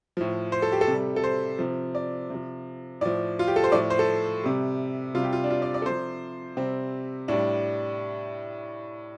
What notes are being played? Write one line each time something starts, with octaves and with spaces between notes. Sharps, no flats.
A2 F3
C5
A4
G4
A4
C3 G3
A4
C5
C3 F3
D5
C3 F3
A2 F3 D5
F4
G4
A4
C5
A2 F3 D5
C5
A4
C3 G3
C3 G3 F4
G4
F4
D4
F4
D5
D5
A4
C3 F3 C5
C3 G3 C4
A2 G3 D4